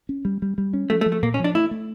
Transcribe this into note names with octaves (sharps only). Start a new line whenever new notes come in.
C#4
G3
G3
G3
C#4
F3 A3
A3
F3
A3
A#2 A#3
C#4
F3
D4
A3 E4
A3